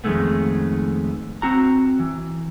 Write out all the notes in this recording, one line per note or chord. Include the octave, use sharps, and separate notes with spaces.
F2 G#2 D#3 G#3 A3 B3
C4 F#4 A#5
E3